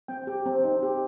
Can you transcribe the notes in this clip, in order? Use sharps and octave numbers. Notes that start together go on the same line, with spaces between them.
C4 G5
G4
C4
D#4
G4